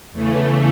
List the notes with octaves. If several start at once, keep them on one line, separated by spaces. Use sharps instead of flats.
E2 C#3 E3 A3